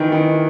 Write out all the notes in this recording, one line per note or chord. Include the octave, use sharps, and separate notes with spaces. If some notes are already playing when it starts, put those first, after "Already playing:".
Already playing: D#3 E3
D#3